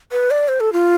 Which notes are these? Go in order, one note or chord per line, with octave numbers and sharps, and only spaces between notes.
B4
D5
C5
A4
F4